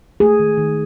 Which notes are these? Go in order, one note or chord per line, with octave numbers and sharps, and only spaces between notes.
A3 G#4
D#3
D#3